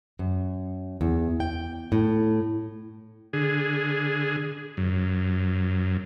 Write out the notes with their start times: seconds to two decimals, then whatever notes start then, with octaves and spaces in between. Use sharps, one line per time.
0.19 F#2
1.01 E2
1.40 G5
1.92 A2
3.33 D3 G#4
4.77 F#2